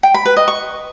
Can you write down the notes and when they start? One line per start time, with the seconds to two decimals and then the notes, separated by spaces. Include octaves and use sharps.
0.03 G5
0.14 B5
0.25 B4
0.37 D#5
0.48 C#6